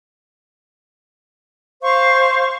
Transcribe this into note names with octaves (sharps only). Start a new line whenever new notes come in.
C5 F5 C#6